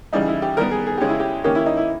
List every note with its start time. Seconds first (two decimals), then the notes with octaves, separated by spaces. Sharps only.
0.13 C#3 E3 G3 D#4
0.28 E4
0.42 G4
0.57 D#3 G3 B3 A#4
0.71 G#4
0.86 G#4
0.98 C#3 G#3 C#4 G4
1.09 E4
1.20 G4
1.44 D#3 A#3 C#4 G4
1.55 E4
1.66 D#4
1.77 E4